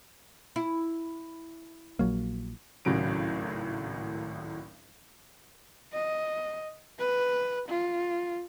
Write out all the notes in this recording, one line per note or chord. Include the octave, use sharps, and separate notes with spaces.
E4
A#1 F#3 A#3
G#1 C#2 A2 F#3 C#4 D7
D#5
B4
F4